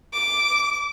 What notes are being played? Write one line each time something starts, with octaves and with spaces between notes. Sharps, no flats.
D6